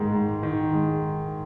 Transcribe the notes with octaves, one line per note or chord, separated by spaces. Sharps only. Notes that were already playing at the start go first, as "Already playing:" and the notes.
Already playing: G#2 D#3 G#3
G#2
D#3
G#3